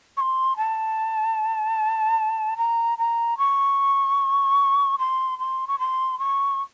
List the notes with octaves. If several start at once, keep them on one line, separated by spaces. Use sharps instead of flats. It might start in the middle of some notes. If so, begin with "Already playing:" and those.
C#6
C6
A5
A#5
A#5
C#6
C6
C6
C#6
C6
C#6